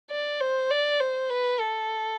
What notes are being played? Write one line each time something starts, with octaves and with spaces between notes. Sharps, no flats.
D5
C5
D5
C5
B4
A4